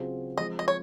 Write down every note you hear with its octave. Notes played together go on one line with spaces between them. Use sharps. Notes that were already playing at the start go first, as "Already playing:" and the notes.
Already playing: C#3 F#3 C4 F4 G#4
F3 G#3 C4 D#5
D#5
C#5